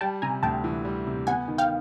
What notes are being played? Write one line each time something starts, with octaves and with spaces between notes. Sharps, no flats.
G3 G5 A5
C3 G#5 A#5
D2 G5 A5
E3
G3
C3
B3 F#5 G#5
D#3
F5 G5